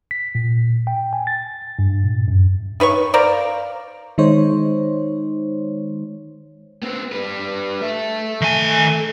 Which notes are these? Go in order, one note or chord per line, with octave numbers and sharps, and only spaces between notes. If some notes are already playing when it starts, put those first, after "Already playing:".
B6
A#2
G5
G#5
A6
G2
A#2
F#2
D#3 B4 C#5 C#6
A#4 C5 D5 F5
D#3 G#3 D#4 C5 C#5
B3 C4
G3 B4
A4 E5
D#3 G#5